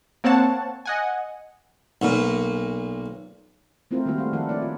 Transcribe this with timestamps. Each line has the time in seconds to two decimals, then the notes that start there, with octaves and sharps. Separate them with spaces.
0.24 A#3 C4 C#5 F#5 A5
0.85 D#5 F#5 G#5
2.02 B1 A#2
3.91 A3 C4 E4 F4 A#4 C5
4.05 D#3 G3 A#3 E4 F#4 C5
4.18 A3 F5
4.33 D#3 F3 E4 A4 A#4 F#5
4.49 D4 E4 C#5 D5
4.62 F4